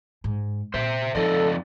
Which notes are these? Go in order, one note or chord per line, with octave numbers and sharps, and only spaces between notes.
G#2
A#2 C5 E5
F2 F3 D#4 A4 D5 D#5